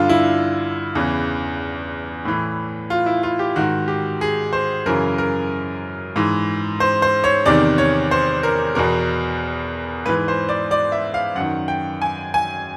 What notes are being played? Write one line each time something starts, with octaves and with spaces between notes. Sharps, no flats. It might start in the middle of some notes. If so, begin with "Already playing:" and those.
Already playing: G2 D3 F4
E4
E2 C#3 E3
A2 E3
F4
E4
F4
G4
G#2 D#3 F#4
G4
G#4
C5
F#2 C#3 E3 A#4
A#4
G#2 E3
C5
C5
C#5
E2 C3 D#3 D5
C#5
C5
A#4
E2 B2 A#4
G#2 E3 B4
C5
D5
D5
E5
F5
F#2 F#5
D#3
G5
G#5
G#5